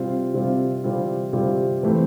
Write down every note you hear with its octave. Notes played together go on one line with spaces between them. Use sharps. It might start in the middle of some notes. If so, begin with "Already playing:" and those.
Already playing: C3 G3 C4 F4
C3 G3 C4 F4
C3 G3 C4 F4
C3 G3 C4 F4
E3 A3 C4